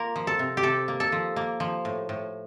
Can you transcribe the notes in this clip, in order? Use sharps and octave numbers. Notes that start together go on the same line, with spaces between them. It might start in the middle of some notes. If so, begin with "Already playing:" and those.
Already playing: A#3 F4 A#4
F3
A4
C3
G4
C3 A4
A#3
A4
F3
A#3
F3
A2
A2